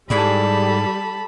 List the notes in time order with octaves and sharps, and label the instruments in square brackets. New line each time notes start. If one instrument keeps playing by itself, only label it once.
[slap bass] G#2 [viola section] G3 A4 [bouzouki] E4 G#4 D5 [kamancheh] A5 B5